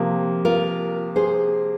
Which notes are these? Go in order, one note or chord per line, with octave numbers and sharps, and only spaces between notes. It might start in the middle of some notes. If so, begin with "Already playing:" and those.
Already playing: C3 F3 A#3
F4 A#4
G#4 C5